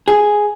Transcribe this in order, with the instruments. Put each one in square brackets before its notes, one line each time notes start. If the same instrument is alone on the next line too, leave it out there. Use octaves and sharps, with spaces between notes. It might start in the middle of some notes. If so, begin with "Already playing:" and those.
[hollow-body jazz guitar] G#4